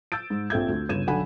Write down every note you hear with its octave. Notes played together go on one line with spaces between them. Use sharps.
E6 G6 A6 D7
G#2
A#1 C4 A4 E5 G6 G#6
D2
G1 C#3 G#6 D#7 E7
B1 D3 A4 F#5 G#5 B5